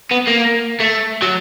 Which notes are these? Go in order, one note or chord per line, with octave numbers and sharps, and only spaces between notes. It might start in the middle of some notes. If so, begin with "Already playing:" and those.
B3
A#3
A3
F#3